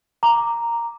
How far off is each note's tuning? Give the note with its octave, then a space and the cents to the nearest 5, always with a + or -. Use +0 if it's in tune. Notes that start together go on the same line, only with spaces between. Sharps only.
A#5 +0 D6 +0